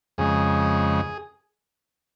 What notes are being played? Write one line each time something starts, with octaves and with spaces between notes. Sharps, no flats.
F2 C#3 G#3 G#4